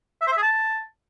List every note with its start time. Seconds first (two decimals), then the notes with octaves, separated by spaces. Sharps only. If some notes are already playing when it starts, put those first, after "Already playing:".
0.21 E5
0.27 C5
0.32 E5
0.37 G#4
0.42 A5